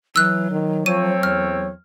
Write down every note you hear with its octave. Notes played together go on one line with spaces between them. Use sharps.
E3 F#3 E6 F#6
D#3
F3 A3 C4 C#5 D#7
E2 F6